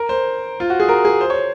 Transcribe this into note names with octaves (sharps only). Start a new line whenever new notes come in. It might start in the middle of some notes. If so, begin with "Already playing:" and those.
Already playing: A#4
C5
F4
F#4
G#4
A#4
G#4
C5
C#5